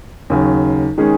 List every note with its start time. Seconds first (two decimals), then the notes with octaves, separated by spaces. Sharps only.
0.30 D#2 C#3 F#3
0.98 D#3 G#3 C#4 G#4